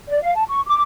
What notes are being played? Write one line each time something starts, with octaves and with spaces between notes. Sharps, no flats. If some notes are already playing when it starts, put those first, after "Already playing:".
D5
F5
A5
C#6
D6